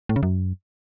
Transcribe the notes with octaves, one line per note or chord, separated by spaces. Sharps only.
A2
C#3
F#2